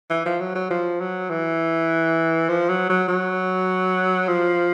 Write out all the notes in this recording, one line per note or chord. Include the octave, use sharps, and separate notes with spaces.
E3
F3
F#3
F#3
F3
F#3
E3
F3
F#3
F#3
F#3
F3